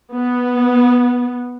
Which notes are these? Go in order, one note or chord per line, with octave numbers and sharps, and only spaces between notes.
B3